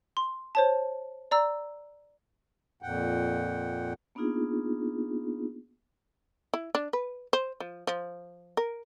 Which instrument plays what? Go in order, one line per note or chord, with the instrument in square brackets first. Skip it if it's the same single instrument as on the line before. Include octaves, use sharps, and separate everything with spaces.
[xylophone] C6
C5 C#5 A5
D5 A#5 E6
[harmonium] F2 A#2 F#5 G5
[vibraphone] A#3 B3 D4 D#4 F4 G#4
[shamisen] E4
D4
B4
C5
F3
F3
A#4